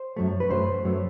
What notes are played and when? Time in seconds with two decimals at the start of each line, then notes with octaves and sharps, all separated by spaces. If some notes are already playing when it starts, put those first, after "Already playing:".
Already playing: C5
0.16 F#2 F#3 A3
0.40 B4
0.50 F#2 F#3 A3 C5
0.84 F#2 F#3 A3